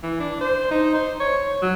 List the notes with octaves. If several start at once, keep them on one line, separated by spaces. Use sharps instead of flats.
E3
D4
C5
D#4
C5
C#5
F#3